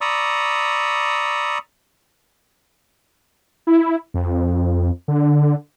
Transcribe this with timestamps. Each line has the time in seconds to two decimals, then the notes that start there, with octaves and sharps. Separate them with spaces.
0.01 D5 A#5 B5 C#6 D#6 E6
3.67 E4
4.14 F2
5.08 D3